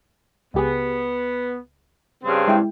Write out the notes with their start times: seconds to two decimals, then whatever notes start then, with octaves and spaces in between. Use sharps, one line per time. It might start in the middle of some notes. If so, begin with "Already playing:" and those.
0.54 C#2 B3 G4 G#4
2.24 G2 C#3 C4
2.48 G#3 E4 G5